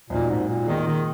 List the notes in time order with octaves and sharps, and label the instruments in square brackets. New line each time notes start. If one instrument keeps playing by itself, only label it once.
[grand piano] G#1 F#2 D#3 A#3 F#4 [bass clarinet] A#2
[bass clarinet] G#2
A#2
[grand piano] A#2 A#3 D#4 G#4 [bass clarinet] D#3
[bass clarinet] D#3